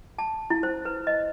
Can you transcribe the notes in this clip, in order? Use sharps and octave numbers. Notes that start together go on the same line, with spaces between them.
A5
E4
C5
B4
D#5